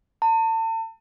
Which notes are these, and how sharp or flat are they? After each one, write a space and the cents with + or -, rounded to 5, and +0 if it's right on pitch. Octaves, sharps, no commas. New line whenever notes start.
A5 +40